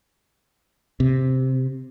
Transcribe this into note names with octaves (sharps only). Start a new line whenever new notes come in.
C3